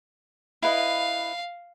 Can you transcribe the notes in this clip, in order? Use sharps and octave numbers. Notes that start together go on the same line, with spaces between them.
E4 B4 D#5 F5